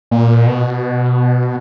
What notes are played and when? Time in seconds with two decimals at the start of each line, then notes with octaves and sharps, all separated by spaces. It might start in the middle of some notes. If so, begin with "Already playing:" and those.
0.11 A#2
0.47 B2